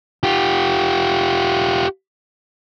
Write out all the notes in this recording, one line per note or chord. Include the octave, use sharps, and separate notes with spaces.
F4 G4